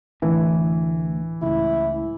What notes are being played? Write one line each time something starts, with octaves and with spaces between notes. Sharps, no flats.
D2 A2 E3
C#2 A2 E4